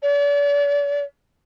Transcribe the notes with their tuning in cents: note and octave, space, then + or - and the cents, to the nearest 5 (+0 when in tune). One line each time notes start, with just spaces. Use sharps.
D5 -40